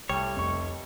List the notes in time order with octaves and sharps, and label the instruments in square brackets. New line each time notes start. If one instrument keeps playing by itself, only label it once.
[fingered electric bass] C2 [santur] G3 A3 [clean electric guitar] C#5
[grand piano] F1 C#6